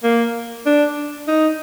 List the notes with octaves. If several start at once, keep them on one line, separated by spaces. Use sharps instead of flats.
A#3
D4
D#4